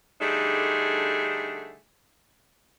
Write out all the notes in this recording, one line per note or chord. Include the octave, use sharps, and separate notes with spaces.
D3 G3 A3 D4 D#4 G#4